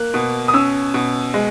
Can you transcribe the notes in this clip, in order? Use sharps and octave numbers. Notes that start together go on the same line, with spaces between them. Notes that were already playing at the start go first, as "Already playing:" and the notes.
Already playing: A#3 F#6
B2
D#6
C#4 E6
B2
G#3